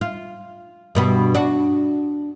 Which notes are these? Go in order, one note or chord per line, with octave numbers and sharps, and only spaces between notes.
F4
G2 B2 B3
D4 F#4